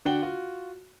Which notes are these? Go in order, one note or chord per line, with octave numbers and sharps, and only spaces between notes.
D3 D4 F#4 F#5 G5 G7
F4 F#4